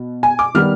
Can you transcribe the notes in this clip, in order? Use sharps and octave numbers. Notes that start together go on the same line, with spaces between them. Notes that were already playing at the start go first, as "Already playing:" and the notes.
Already playing: B2
G#5
D6
D#3 G3 B3 F6